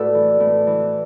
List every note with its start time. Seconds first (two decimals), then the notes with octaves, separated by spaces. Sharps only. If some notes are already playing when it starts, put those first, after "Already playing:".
Already playing: A2 F#4 A4 B4 D5
0.14 E3
0.40 A2
0.67 E3